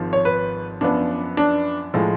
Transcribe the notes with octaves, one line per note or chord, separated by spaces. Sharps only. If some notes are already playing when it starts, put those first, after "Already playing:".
Already playing: G#1 G#2 F3
C#5
B4
F#2 F3 B3 D4
D4
A2 F3 G#3